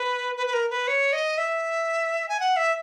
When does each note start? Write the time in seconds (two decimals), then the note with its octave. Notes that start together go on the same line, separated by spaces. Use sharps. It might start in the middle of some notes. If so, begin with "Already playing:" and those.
Already playing: B4
0.36 B4
0.47 B4
0.53 A#4
0.70 B4
0.88 C#5
1.13 D#5
1.38 E5
2.29 G#5
2.40 F#5
2.56 E5